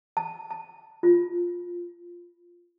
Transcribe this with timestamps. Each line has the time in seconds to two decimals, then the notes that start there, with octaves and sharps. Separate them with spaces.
0.17 A5
0.51 A5
1.03 F4